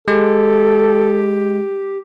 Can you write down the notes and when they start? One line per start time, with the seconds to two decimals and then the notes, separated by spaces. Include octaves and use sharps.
0.08 G#3 G4 A4